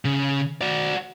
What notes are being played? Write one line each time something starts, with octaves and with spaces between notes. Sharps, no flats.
C#3
F#4 D5